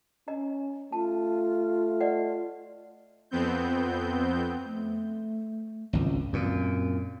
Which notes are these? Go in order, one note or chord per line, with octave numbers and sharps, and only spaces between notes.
C#4 D#5 A#5
A3 F4 A5
D5 D#5 F#5
F2 B3 C4 G6
A3
G#1 C#2
F#2 A#2 C4